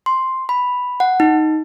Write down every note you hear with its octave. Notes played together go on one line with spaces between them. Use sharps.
C6
B5
F#5
D#4